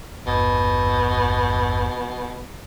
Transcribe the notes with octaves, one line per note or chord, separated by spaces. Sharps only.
G#1 E2 G2 B2